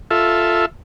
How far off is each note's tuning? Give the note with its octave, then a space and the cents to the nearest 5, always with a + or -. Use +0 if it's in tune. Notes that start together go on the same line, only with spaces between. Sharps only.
F4 +0 A4 +0 E5 +0